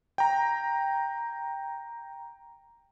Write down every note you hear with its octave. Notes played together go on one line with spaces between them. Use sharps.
G5 A#5